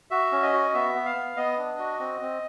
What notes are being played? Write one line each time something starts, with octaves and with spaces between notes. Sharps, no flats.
F#4 E5
C#4
D#5
F#4
B3 E5
B3
F5
B3
B3 D#5
D4
F#4
C4
C4